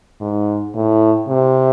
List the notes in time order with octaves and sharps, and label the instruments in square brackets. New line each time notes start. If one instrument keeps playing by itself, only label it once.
[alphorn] G#2
A2
C3